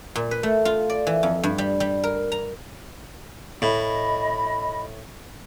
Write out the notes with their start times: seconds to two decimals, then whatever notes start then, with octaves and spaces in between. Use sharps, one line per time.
0.16 A#2
0.31 B4
0.43 A3
0.65 F4
0.90 D5
1.07 E3
1.23 F2
1.44 G2
1.58 G3
1.80 G3
2.04 A#4
2.32 A#5
3.62 A2 D#5 B5